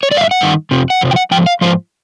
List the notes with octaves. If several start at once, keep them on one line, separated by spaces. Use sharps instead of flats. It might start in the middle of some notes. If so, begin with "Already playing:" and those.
C#5
D#3 D5
G2 F5
E5
F#5
G2 D#3
F2 C3 F3
F#5
F2 C3 F3
G5
F#5
G#2 F3 G5
F5
G#2 F3 C5